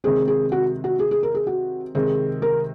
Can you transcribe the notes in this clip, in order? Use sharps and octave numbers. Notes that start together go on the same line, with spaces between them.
C3 D#3 G#3 C4 G#4
G#4
F#4
F#4
G#4
G#4
A#4
G#4
F#4
C3 D#3 G#3 C4 G#4
A#4